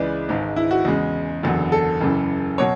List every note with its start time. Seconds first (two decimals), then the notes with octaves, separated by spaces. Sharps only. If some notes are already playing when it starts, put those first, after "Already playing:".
Already playing: C#2 C#3 E3 G#3 B4 D5
0.29 G#1 G#2 G#3
0.56 E4
0.71 F#4
0.85 E2 C#3 G#3
1.43 F#1 E2 D3 F#3
1.72 A4
2.01 F#1 F#2 C#3 E3
2.58 B2 F#3 C#5